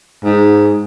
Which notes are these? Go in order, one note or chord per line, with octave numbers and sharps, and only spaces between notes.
G#2